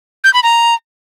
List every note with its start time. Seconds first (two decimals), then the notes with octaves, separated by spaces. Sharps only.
0.24 G6
0.34 B5
0.43 A#5